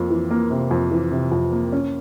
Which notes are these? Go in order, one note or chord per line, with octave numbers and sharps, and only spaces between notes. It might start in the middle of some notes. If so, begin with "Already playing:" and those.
Already playing: F2 A#3
E3
A#3
C3
F2
E3
C3
F2
A#3
C#4